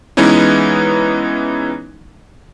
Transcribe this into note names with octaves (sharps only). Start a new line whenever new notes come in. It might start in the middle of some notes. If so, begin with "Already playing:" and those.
E3 G#3 B3 C#4 D#4 E4